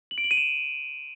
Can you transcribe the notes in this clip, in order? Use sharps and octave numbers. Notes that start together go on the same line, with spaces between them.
F#7
D7
F#7
D#7
E7